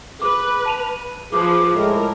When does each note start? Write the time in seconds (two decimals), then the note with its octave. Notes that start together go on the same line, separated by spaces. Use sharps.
0.22 G#4 B4 D6
0.66 A5 D#7 F7
1.32 F3 G#4 B4 D6
1.74 A2 G#3 A#4